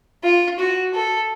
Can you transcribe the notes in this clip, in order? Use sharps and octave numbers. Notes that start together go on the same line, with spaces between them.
F4
F#4
A4